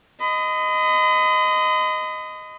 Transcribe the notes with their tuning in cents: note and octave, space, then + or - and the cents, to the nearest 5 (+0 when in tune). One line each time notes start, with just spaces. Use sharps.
D#5 +0 B5 +45